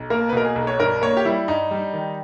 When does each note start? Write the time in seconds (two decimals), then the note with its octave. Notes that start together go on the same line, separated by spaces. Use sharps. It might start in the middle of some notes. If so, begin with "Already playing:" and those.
Already playing: B1
0.10 A#3 A#4
0.29 B4
0.33 B2 A#4
0.45 G#4
0.56 B1
0.67 C#5
0.79 G2 A#4
1.02 A#3 C#5
1.17 G4
1.25 G3 E4
1.48 G2 D#4
1.71 G3
1.94 D#3